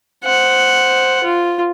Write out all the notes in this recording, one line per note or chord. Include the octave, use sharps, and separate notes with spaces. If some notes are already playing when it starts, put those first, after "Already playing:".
C5 F#5
F4